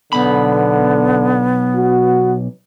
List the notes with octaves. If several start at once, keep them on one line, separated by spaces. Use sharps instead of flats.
B1 D3 B3 B5
F#4